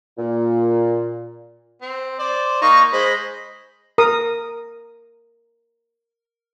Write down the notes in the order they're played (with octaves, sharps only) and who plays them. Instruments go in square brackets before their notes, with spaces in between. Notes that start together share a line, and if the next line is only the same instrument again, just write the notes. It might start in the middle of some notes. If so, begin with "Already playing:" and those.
[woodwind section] A#2
[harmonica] C4
C5 D5
[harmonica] A#3 D#4 [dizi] C#6
[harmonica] G#3 D#5 B5 [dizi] C5
[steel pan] A#4 D#6